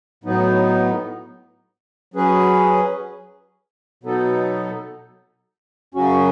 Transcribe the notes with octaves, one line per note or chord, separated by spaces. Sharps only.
A2 F#3 B3 D#4
F#3 C#4 G#4 B4
B2 F#3 B3 D#4 A4
F#2 C#3 F#3 C#4 F#4